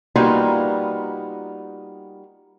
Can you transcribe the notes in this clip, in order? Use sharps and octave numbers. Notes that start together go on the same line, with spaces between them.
G3 A#3 B3 D#4 F4 F#4